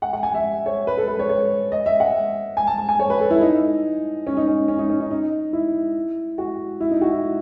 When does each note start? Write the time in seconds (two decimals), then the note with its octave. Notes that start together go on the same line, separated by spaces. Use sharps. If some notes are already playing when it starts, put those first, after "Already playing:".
0.02 F#5
0.13 F#5
0.23 G#5
0.34 E5
0.66 C#5
0.87 B4
0.97 A4
1.08 B4
1.19 C#5
1.29 C#5
1.72 D#5
1.86 E5
2.00 F#5
2.57 G#5
2.67 A5
2.78 A5
2.89 G#5
2.99 C#5
3.10 B4
3.20 A4
3.30 E4
3.41 D#4
4.27 C#4
4.37 D#4
4.47 C#4
4.68 C#4
4.79 D#4
4.90 C#4
5.00 D#4
5.11 D#4
5.53 E4
6.38 F#4
6.80 E4
6.91 D#4
7.01 F#4
7.12 E4